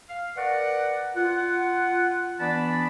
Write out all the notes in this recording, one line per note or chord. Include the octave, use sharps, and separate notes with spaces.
F5
A#4 B4 D5 F#5
F4 F#5
E3 B3 D4 D5 A5 B5